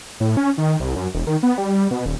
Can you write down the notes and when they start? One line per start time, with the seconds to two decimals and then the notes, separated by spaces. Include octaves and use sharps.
0.20 A2
0.37 C#4
0.58 D#3
0.80 C2
0.96 F#2
1.14 E1
1.27 D#3
1.43 B3
1.58 G3
1.91 B2
2.06 D#1